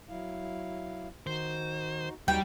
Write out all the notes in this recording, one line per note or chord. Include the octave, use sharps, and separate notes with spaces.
F#3 E4 F5
D#3 D#4 F#4 C5
D#2 F#3 G3 D#4 F#4 G5